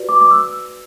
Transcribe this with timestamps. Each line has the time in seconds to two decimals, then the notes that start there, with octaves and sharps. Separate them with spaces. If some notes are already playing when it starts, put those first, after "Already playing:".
Already playing: F#4 B4 D5
0.09 D6
0.21 D6
0.31 E6